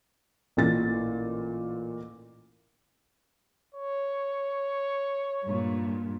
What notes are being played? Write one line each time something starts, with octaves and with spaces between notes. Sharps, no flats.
A1 A#2 A6
C#5
G2 A#2